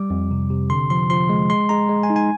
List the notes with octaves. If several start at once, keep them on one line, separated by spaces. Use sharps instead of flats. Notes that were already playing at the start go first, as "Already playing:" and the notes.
Already playing: G3 D6
F2
C3
C3
D3 C6
F3 C6
F3 C6
G#3
G#3 C6
G#3 A#5
G#3
G#5
D#4
G#5